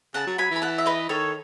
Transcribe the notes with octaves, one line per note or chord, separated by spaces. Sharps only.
C#3 F#5 A5
F#3
F#3 G#5 B5
E3
B5
F#5 A5
E5
B4 D#5
D#3 A4 C#5